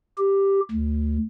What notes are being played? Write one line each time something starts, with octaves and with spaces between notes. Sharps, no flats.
G4
D2